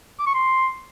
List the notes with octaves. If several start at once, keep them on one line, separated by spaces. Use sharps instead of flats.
D6
C#6
C6